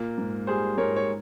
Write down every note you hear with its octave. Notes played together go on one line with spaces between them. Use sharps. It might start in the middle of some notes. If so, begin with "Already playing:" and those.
Already playing: A#2 A#3
G#2
G3 G#4 C5
G#2 A#4 C#5
C#5